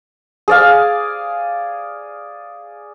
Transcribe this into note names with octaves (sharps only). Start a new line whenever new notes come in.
G#4 D5 F5